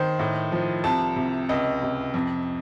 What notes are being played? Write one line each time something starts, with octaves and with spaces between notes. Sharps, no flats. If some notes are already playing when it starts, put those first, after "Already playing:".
Already playing: D#3 C5
A2
F3
C2 A5
C3
C#2 D#5
C3
F2